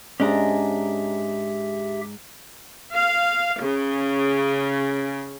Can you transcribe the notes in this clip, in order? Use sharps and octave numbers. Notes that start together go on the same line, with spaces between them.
G#2 C#4 D4 G4 G#4 E5 A#5
F5
C#3